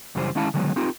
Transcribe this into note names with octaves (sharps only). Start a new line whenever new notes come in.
F#2 C#3 E3 G3 G#4 C5
D#3 G#3 C#4 E4 F5 A5
D3 D#3 F#3 G#3 B3
C4 D#4 F4 G4 A#4